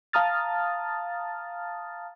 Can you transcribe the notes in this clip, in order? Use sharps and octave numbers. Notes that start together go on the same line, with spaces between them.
F5 A5 A#5 D#6 F6 A6